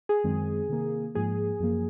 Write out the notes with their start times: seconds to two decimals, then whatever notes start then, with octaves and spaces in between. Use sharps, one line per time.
0.09 G#4
0.24 F#2 D#3 G#3 C4
0.69 C3 D#3 A#3
1.15 G#2 F3 A#3 G#4
1.60 F#2 F3 A#3